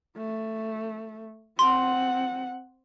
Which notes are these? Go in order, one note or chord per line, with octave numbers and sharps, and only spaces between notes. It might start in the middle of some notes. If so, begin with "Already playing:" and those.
A3
C4 F#5 C6